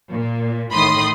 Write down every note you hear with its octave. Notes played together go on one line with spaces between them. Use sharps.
A#2
A1 A2 D#3 B5 C6 D#6